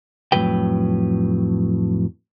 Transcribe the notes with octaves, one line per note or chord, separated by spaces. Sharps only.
F2 A2 D#3 F#3 B4 G5